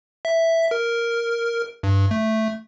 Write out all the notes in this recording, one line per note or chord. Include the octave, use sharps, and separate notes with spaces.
E5
A#4
G2
A3